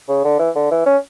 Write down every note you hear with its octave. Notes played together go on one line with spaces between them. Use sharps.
C#3
D3
E3
D3
E3
C#4